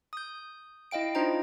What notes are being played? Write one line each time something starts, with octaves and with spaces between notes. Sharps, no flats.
D#6 G6
E4 D#5 F5 G5 D7
D4 D#4 F4 C5 D#5 A#5